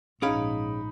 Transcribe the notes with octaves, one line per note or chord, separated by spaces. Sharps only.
A#1 G#2 C#4 D#4 G#4 F5 B5 D7